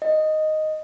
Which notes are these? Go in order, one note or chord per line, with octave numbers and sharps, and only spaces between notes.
D#5